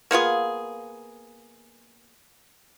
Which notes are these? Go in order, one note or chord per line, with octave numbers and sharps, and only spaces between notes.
A#3 B3 F4 G#4